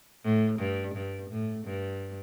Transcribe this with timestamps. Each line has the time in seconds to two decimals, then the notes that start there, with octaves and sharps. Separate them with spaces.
0.23 A2
0.59 G2
0.94 G2
1.29 A2
1.64 G2